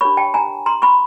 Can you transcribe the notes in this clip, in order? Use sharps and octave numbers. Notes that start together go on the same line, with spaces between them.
D4 G4 A#4 C#5 B5 C#6
G5 A5
G#5 A#5
A#5 C6
B5 C#6